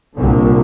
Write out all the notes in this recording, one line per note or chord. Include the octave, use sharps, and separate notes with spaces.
C2 A#2 D3